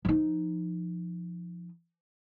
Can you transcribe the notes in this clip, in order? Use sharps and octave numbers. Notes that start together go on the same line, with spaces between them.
F3 D#4